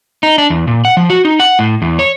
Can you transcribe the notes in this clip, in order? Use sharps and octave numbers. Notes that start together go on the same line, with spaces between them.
D#4
D4
E2
A#2
F#5
F3
F#4
D#4
F#5
A2
E2
C#5